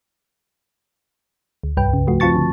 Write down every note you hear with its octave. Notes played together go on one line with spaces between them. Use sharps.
D2
C2 G2 B4 G5
C#3
F3 A3 F#4
F3 C4 F4 A5 C#6 A6
D3 F3